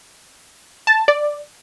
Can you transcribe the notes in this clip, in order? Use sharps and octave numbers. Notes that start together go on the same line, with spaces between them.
A5
D5